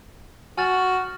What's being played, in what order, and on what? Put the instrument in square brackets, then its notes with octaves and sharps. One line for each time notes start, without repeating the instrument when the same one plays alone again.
[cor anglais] F#4 [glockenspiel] G#5 F6 A6